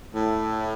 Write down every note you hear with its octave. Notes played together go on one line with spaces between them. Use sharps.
A2